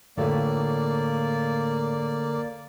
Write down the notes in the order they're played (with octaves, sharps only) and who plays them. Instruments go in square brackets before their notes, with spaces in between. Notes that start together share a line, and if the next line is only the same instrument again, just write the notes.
[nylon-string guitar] A2 F4 B4 [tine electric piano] D3 A4 C#5 [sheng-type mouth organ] A#3 D5